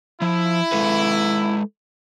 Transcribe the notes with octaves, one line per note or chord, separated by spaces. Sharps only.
F3 E4
G#3 A4 B4